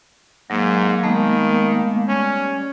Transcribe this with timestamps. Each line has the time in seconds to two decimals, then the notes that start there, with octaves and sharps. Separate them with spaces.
0.50 G#2 F#3 A#3
1.03 D#3 G#3 A3 B3
2.08 G3 C#4